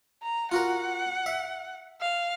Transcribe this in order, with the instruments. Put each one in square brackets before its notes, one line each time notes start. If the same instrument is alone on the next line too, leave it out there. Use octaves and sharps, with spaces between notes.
[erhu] A#5
[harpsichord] F4 F#4 A#4 [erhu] F#5
[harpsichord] E5
[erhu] F5